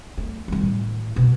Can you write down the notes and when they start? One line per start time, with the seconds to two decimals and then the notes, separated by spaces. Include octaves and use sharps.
0.18 A3
0.48 D#3 G3
0.61 A2
1.16 B2